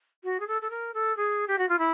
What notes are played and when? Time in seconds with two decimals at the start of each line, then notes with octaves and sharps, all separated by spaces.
0.24 F#4
0.40 G#4
0.47 A4
0.62 A4
0.70 A#4
0.94 A4
1.17 G#4
1.48 G4
1.58 F#4
1.69 F4
1.79 E4